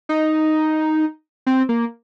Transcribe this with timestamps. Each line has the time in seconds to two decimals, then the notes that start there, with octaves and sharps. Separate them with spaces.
0.09 D#4
1.47 C4
1.69 A#3